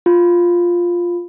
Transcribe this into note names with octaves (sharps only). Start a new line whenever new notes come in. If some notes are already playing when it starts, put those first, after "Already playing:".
F4